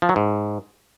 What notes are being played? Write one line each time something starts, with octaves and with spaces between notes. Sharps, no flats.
F3
F#3
G#2